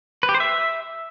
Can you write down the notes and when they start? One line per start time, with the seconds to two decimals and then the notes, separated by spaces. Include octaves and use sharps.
0.23 B4
0.29 G4
0.34 C5
0.40 E5